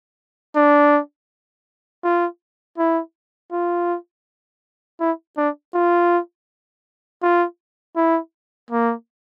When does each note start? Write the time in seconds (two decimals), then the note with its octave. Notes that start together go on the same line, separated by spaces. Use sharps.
0.55 D4
2.04 F4
2.78 E4
3.52 F4
5.00 E4
5.37 D4
5.74 F4
7.22 F4
7.96 E4
8.71 A#3